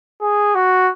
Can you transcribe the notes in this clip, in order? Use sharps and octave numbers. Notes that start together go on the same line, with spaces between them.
G#4
F#4